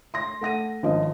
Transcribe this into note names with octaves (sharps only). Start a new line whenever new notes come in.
C6 A#6
A3 F#5 A#6 D#7
G#1 F3 C#4 D#5